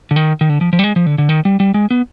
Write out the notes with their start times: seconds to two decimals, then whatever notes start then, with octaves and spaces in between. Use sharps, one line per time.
0.11 D3
0.16 D#3
0.41 D#3
0.49 D3
0.61 F3
0.73 F3
0.79 G3
0.84 G#3
0.96 F3
1.06 D3
1.18 D3
1.29 D#3
1.45 G3
1.60 G3
1.74 G#3
1.91 B3